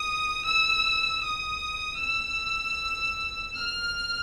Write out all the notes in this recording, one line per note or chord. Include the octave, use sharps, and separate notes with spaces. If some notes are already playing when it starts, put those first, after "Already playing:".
Already playing: D#6
E6
D#6
E6
F6